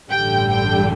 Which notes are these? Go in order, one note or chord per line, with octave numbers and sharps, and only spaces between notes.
A1 G2 D3 G3 G5
G5